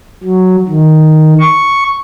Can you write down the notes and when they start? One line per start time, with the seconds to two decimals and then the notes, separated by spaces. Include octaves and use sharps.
0.24 F#3
0.69 D#3
1.39 C#6